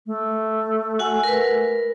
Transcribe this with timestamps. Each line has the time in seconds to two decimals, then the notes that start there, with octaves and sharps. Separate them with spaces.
0.06 A3
0.99 F#4 F#5 G#5
1.23 A#4 B4